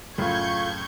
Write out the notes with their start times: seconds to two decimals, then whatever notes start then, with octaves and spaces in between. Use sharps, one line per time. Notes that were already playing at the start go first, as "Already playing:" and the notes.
0.18 F#2 A2 C#3 F4 A4 C#6 G6 G#6